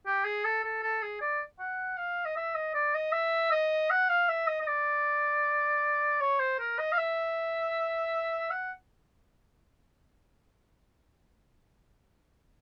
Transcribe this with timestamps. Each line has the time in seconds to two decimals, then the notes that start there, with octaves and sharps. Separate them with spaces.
0.06 G4
0.25 G#4
0.44 A4
0.64 A4
0.83 A4
1.02 G#4
1.21 D5
1.59 F#5
1.97 F5
2.25 D#5
2.36 E5
2.55 D#5
2.74 D5
2.95 D#5
3.13 E5
3.52 D#5
3.90 F#5
4.09 F5
4.29 E5
4.48 D#5
4.61 D#5
4.67 D5
6.20 C#5
6.40 C5
6.60 A#4
6.79 D#5
6.92 F5
6.98 E5
8.51 F#5